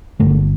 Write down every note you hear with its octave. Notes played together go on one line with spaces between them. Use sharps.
G1 G2 D3 A3